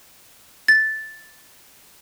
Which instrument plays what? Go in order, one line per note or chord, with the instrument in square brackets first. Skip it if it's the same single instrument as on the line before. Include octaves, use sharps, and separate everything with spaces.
[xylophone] A6